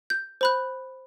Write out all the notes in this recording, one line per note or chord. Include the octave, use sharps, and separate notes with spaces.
G6
C5 B5 F#6